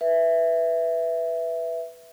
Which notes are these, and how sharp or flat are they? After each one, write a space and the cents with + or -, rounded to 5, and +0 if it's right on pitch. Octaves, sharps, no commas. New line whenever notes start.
B4 +0 E5 +0